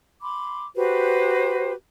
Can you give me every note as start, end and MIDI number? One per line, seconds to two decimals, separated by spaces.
0.22 0.66 83
0.22 0.66 84
0.22 0.66 86
0.76 1.72 66
0.76 1.72 67
0.76 1.72 71
0.76 1.72 72